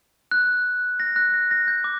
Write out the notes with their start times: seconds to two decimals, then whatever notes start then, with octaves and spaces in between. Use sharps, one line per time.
0.31 F#6
1.00 A#6
1.16 F#6
1.34 A#6
1.51 A#6
1.68 G6
1.84 D6